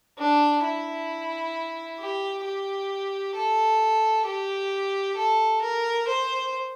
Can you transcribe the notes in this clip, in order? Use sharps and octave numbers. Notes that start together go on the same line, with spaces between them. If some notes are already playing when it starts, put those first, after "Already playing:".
D4
E4
G4
G4
A4
G4
A4
A#4
C5